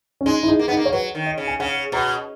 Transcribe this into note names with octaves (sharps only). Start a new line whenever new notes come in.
C#4
G#3 D#4
E4
D#4
A#3
B3 D#4
A#3
C#5
F#3 B4
D#3
D#5
C#3
G#5
C#3 F#5
B2 A#5